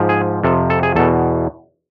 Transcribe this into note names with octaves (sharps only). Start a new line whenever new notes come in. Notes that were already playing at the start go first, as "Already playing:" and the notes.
Already playing: G#2 F3
G#4
F2 C3 F3 A4
A4
G#4
E2 B2 A4